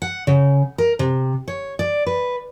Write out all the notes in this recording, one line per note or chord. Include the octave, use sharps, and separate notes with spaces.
F#5
C#3
A#4
C3
C#5
D5
B4